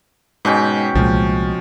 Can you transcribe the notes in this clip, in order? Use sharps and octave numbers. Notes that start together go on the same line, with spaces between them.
G#2 B2 C#4 G5
C2 A#2 F3 G#3